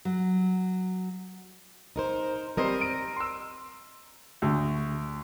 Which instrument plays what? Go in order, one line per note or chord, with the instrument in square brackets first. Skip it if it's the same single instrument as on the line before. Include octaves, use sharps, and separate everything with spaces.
[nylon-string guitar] F#3
[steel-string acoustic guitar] D#4 A#4 C5
[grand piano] G3 C4 C5 [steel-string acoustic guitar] A#4 D#5
[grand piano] D7 D#7
C6 E6
[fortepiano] D2